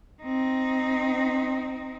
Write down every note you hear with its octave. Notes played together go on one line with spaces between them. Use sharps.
C4 D#4